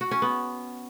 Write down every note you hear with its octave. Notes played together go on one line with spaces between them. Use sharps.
F#4
C#4
B3